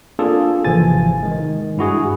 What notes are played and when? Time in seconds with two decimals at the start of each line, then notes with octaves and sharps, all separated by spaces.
0.19 A#3 C4 D4 F4 G#4 A4
0.65 G#1 C3 E3 F3 G#5 A6
1.23 D#3 G#3
1.77 G2 E4 F#4 G#4